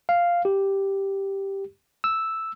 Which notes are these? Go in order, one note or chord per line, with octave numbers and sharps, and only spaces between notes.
F5
G4
E6